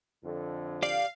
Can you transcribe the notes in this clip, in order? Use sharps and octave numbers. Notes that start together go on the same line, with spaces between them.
F2 D3
G4 D5 F5